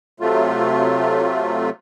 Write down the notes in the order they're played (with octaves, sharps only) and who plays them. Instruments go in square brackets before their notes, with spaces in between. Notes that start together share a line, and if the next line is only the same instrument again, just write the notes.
[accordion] C3 F#3 A3 F4